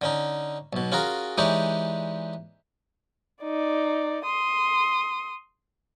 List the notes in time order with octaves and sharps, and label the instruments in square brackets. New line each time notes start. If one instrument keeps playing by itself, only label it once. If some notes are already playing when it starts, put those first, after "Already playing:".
[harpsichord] D3 C#4 D#4
B1 B2
C#4 F4 F#4 G#4 A#4
E3 G#3 D4 D#4 G4 C#5
[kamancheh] D#4 D5
C6 D#6